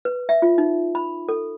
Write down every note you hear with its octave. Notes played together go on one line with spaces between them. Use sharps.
B4
E5
F4
D#4
B5
A4